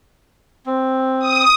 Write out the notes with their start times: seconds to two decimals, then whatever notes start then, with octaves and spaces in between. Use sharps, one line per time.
0.66 C4
1.19 D#6